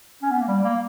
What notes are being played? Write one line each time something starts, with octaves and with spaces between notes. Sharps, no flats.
C#4
B3
A#3
G3
A#3